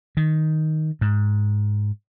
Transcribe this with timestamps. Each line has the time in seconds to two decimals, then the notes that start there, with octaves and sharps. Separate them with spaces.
0.17 D#3
1.01 G#2